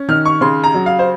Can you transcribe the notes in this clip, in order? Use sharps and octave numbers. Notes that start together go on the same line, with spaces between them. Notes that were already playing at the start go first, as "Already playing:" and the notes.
Already playing: C#4
D#3 F6
C#6
C#3 C6
A#5
F#3
F5
C5